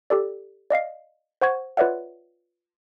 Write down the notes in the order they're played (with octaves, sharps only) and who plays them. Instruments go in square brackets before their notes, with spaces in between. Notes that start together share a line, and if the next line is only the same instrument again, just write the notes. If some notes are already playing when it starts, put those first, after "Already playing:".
[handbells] G4 A4 D5
D5 D#5 F5 C7
C5 F#5 C#6 G#6
F4 B4 C#5 D5 E5 F#5